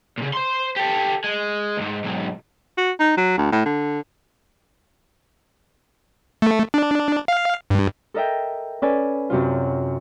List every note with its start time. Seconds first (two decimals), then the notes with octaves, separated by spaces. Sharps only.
0.18 A#2 C#3
0.33 C5 C6
0.76 G4 A4
1.24 G#3
1.77 D2 G#2
2.04 B1 G#2
2.78 F#4
3.00 D#4
3.17 F#3
3.38 D2
3.52 A2
3.66 D3
6.42 A3
6.74 D4
7.28 F5
7.70 G2
8.14 A4 A#4 D#5 E5 G5
8.82 C#4 A4 B4 D5 G#5
9.30 F#2 C3 F#3 F4